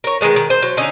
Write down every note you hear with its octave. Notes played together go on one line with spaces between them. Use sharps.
A#4 C#5
D#3 F#3 G#3 B3
D#3
C5
F#3
D3 C#4 D#4